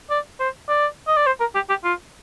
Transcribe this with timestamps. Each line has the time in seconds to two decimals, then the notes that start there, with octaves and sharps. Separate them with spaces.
0.11 D5
0.40 C5
0.69 D5
1.08 D#5
1.17 D5
1.27 C5
1.40 A#4
1.55 G4
1.69 G4
1.84 F4